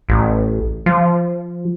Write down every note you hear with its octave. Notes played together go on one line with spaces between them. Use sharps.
A1
F3